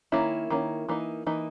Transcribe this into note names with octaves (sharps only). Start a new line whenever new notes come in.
D#3 A#3 C#4 E4
D#3 A#3 C#4
E3 A#3 D#4
E3 A#3 D#4